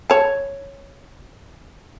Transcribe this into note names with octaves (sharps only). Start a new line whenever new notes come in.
C#5 A5